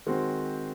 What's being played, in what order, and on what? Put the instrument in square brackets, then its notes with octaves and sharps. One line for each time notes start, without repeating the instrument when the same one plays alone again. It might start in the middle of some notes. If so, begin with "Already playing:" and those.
[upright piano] D#3 G#3 C4 F#4 C5